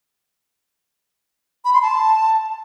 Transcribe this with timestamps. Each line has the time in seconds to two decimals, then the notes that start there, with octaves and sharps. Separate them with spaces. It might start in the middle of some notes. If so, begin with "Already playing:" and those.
1.65 B5
1.74 C6
1.82 A5